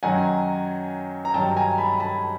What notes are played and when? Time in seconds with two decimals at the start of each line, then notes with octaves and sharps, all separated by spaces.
0.03 F#2 D#3 F#3 F#5 G#5
1.25 A#5
1.34 G2 D#3 F#3 G5 A5
1.56 G#5 A#5
1.78 A5 B5
2.00 A5 B5